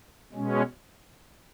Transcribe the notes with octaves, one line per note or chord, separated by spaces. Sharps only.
B2 G#3 C#4